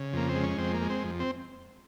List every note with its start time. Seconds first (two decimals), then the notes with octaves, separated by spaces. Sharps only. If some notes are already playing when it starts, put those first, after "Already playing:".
Already playing: C#3
0.13 F2 A#3
0.29 C4
0.35 G#3
0.43 C#4
0.58 F2 C4
0.74 A#3
0.82 G#3
0.90 C4
1.04 F2
1.20 C4